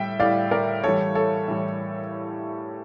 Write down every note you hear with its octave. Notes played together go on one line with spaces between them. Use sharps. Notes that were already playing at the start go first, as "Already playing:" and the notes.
Already playing: A2 G3 E5 G5
A2 G3 D5 F5
A#4 D5
A2 E3 G3 A4 C#5
A4 C#5
A2 E3 G3